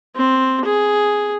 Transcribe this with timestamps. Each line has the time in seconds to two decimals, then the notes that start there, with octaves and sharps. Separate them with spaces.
0.16 C4
0.65 G#4